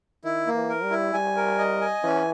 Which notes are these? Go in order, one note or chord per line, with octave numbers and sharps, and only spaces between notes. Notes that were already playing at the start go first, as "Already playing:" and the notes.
D#3 E4
A#3
E3
A#4
G3
E4
G3 G#5
A#4
D#5
G#5
E3 C#4